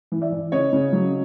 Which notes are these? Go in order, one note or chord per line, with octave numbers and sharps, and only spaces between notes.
E3
D5 E5
E3
C#3 C#5 D#5
C#3
F#3